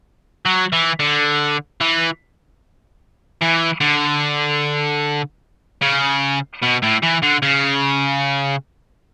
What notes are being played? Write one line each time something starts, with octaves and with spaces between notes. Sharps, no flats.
F#3
E3
D3
E3
E3
D3
C#3
B2
A2
E3
D3
C#3